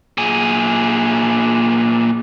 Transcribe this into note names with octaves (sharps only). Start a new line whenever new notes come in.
A#2 G#4